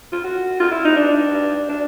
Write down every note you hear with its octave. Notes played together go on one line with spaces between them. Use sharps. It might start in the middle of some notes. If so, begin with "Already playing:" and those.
F4
F#4
F4
E4
D#4
D4
D4